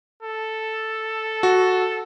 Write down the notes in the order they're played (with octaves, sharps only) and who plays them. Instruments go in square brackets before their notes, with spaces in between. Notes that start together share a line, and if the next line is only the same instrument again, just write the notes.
[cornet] A4
[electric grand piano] F#4